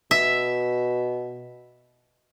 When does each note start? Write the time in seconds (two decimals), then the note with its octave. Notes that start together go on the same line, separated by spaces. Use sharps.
0.11 B2 E5